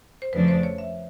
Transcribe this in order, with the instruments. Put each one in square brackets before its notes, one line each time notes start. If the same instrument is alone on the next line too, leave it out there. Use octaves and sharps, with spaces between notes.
[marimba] C5
[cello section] F2 C#3 F3 A3 D4 [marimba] B4
[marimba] C5
C#5
E5